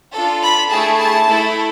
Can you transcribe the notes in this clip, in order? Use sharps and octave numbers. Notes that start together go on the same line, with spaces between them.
D4 F4 A4
B5
A3 E4 G#4 A5
A5
A3 E4 A4